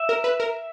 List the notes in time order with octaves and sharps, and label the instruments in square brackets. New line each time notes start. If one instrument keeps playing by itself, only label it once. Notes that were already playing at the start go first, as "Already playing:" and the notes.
Already playing: [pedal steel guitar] E5
[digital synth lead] A#4
B4
A#4